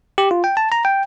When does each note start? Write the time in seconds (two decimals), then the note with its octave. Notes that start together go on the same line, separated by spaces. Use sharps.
0.18 G4
0.31 F4
0.44 G5
0.57 A5
0.72 A#5
0.85 G5